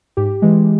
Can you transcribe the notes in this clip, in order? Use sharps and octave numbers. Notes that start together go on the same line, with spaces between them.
G#2 G4
E3 G#3